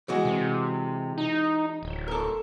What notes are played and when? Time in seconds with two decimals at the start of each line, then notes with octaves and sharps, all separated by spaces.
0.08 E3 G#3 F#4
0.25 C3
1.18 D#4
1.83 D1
2.08 A4 A#4